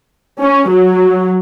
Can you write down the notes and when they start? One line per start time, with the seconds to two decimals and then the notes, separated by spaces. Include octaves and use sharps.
0.41 C#4
0.70 F#3